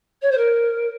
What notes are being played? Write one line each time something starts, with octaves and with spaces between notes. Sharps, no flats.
C#5
C5
A#4